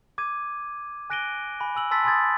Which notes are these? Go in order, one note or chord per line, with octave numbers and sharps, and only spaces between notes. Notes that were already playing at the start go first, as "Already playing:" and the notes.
D6 G#6 D#7
G#5 F#6 A#6 D7 D#7 G7
G#5 B5
G#5 E6 F#7
A5 C6 E6 A6 B6
G#5 B5 C6 D#6 G#6 A6